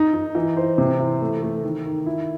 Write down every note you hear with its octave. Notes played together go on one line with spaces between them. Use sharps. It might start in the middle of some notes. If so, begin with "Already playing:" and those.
Already playing: D#4
D#4
E3
C5
C3
E3
A3
A3
D#3
D#3
E4